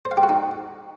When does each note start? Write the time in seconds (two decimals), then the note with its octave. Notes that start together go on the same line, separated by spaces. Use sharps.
0.05 C5
0.11 F5
0.17 G4
0.23 F#4
0.29 D#4